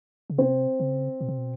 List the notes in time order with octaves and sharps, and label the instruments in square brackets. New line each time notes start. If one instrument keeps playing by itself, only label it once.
[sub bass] C#3
[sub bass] C3 [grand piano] C4
[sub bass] C#3
B2
C3
B2